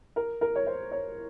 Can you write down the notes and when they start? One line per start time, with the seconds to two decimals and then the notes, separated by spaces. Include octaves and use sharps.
0.16 A#4
0.41 A#4
0.55 C#5
0.67 C5
0.92 C#5